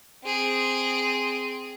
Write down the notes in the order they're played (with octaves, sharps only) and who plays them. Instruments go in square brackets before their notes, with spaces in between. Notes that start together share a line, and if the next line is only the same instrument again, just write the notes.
[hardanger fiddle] C4 G#4